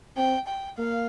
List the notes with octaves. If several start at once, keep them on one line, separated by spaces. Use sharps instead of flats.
C4 G5
G5
A#3 F5